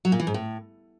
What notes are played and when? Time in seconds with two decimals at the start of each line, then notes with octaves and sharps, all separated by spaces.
0.05 F#3
0.12 A#2
0.20 E3
0.27 G#2
0.34 A2